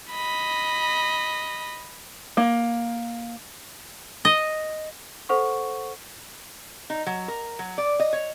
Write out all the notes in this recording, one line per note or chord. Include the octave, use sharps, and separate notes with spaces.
D#5 B5
A#3
D#5
A4 C5 F#5 C#6
D#4
F#3
A#4
F#3
D5
D#5
C#5